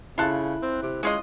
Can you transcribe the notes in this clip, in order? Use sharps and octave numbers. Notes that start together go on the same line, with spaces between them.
C#3 E4 F4 A4 F#6
C4
C3
G#3 C#4 F4 D#5